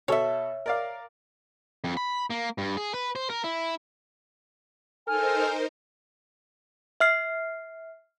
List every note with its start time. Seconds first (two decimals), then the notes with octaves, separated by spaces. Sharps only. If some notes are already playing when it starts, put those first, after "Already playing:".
0.08 B2 A4 C#5 E5
0.66 A#4 D5 F5
1.84 F2
1.97 B5
2.30 A#3
2.58 G2
2.77 G#4
2.94 B4
3.16 C5
3.30 A#4
3.44 E4
5.08 D#4 A4 A#4 C5 G#5 F6
7.00 E5 F6 C7